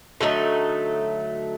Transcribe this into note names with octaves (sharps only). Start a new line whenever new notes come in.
D3 F#3 A3 D#4